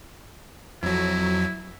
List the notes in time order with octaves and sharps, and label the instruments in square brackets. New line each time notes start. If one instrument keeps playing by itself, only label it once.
[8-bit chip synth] F2 F#3 [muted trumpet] E4